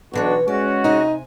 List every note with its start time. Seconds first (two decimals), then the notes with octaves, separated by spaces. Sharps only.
0.13 B1 B2 E3 D4 F#4 C#5
0.48 G#3 C#4 F#4 D5
0.84 C3 D#4 G#5